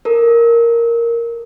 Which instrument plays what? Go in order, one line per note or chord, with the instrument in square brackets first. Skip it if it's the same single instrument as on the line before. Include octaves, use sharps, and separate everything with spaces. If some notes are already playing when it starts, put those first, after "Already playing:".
[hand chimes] A4 A#4